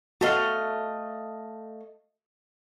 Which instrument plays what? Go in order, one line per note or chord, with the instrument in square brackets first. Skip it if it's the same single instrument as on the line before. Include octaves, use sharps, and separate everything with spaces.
[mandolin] A3 D#5 F5 [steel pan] F#4